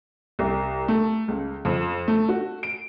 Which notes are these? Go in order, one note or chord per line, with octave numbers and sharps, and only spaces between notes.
C2
A3
C#2
F2
A3
F#4
D7